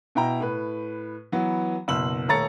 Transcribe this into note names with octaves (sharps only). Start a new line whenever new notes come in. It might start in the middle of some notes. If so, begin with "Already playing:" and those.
B2 E4 G5 A#5
A2 B4
E3 F#3 B3
F#1 B2 E6 F#7
D#1 A3 C#5 A#5 A6 C#7